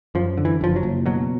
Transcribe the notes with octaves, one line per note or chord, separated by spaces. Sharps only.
F#2 F3
D3
E3
F#1 F3
F#3
F#1
B2 F#3